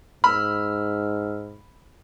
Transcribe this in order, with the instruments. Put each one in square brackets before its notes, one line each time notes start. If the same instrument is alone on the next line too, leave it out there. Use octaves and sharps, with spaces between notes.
[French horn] G#2 [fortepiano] B5 [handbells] E6 F6